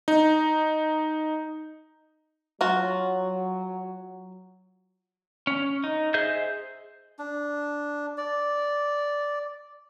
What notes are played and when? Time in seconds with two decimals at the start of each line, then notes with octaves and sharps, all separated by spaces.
0.08 D#4
2.61 F#3 F4 F#4
5.47 C#4
5.84 D#4
6.14 G#4 C5 D#5 E5 G6
7.19 D4
8.18 D5